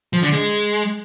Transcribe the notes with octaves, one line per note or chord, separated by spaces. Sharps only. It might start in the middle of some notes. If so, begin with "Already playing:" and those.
F3
D3
G#3